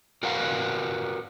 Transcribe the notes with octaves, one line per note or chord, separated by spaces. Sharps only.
F#4 A#4 B4 F5 F#5